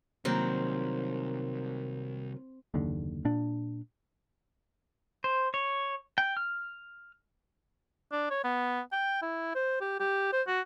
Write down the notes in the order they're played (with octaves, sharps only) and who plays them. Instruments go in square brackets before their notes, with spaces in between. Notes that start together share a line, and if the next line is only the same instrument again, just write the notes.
[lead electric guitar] C2 [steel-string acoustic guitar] D#3 F#3 A#3 [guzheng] C4
[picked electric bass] F#1 D#2 D3
A#2 D4
[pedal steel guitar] C5
C#5
G5
F6
[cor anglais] D4
C#5
B3
G5
E4
C5
G4
G4
C5
F#4